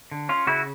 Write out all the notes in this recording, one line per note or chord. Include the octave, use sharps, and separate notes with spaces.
D3
C#4 F4
C#3 E4 F#4